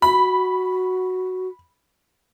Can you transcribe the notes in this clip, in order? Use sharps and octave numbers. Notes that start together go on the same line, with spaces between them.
F#4 B5